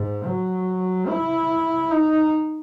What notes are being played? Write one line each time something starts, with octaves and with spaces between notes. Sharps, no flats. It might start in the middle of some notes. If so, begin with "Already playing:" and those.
Already playing: G#2
F#3
E4
D#4